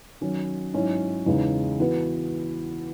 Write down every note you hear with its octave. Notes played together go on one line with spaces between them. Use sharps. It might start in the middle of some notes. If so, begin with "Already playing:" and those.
D#3 F#3 C#4
G#2 F#3 C#4 E4
E2 C#3 G#3 D#4
E3 B3 F#4 B4